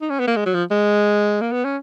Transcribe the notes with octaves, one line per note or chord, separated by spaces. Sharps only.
D#4
C#4
B3
A#3
G#3
F#3
F3
G#3
A#3
B3
C#4